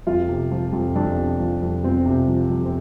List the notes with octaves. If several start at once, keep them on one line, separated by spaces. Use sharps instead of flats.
F2 F4
C3
F3
F2
F2 D4
C3
F3
F2
F2 C4
C3
F3
F2
C4